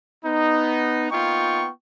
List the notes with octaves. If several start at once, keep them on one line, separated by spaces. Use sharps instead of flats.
B3 D#4
A#3 B3 D#4 F4 G5 C#6